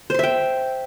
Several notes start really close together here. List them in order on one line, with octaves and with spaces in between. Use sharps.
C5 C6 E5 G5